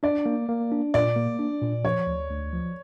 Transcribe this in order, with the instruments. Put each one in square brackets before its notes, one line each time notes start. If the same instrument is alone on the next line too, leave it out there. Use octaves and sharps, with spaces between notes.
[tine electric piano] D4 [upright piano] D5
[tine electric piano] A#3
A#3
D4
[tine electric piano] A#2 [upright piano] D5
[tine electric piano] A#3
D4
A#2
[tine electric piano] F3 [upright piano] C#5
[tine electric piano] D2
D2
F3